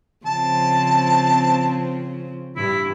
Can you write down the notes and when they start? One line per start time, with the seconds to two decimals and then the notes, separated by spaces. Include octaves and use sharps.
0.26 C#3 F3 C4 A5
2.56 G2 E4